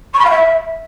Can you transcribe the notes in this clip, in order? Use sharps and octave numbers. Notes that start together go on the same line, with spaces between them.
C#6
B5
F5
E5